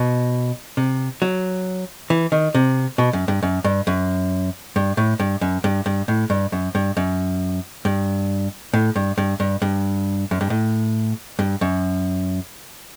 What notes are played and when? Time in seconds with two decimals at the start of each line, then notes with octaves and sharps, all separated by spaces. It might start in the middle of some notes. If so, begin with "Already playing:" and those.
Already playing: B2
0.77 C3
1.22 F#3
2.10 E3
2.32 D#3
2.55 C3
2.98 B2
3.13 F#2
3.28 G2
3.43 F#2
3.64 G2
3.87 F#2
4.76 G2
4.97 A2
5.20 G2
5.41 F#2
5.64 G2
5.86 G2
6.08 A2
6.30 G2
6.52 F#2
6.75 G2
6.97 F#2
7.85 G2
8.74 A2
8.96 G2
9.18 G2
9.40 G2
9.62 G2
10.31 F#2
10.41 G2
10.50 A2
11.39 G2
11.61 F#2